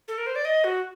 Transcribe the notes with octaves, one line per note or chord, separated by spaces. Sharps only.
A4
A#4
C5
D5
D#5
F#4